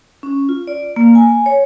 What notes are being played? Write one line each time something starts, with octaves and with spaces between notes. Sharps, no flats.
C#4
F4
D5
A#3
G#5
C#5